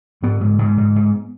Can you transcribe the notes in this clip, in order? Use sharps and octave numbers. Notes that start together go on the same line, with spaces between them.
G#2 B3
G#2
G#2
G#2
G#2